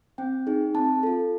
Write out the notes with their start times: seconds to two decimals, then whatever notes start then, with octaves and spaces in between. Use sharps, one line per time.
0.18 C4 G5
0.47 D#4 G#4
0.74 C4 A5
1.03 F4 A4